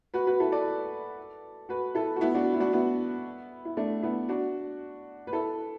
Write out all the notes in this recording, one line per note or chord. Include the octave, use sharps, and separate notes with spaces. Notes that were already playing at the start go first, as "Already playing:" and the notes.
F#4 B4
F#4 B4
E4 A4
A4 D5
F#4 B4
E4 A4
F#4
B3 E4
D4 F#4
E4
D4 F#4
B3 E4
E4
A3 D4
B3 E4
D4 F#4
B4
E4 A4